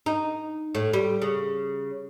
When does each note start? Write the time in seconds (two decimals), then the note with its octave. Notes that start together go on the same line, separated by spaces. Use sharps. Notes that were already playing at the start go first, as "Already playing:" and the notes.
0.06 D#4
0.75 A2
0.93 G3
1.22 C#3